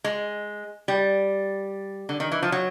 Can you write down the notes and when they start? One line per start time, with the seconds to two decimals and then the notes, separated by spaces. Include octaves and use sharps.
0.04 G#3
0.88 G3
2.09 D3
2.20 D#3
2.32 E3
2.43 F3
2.52 F#3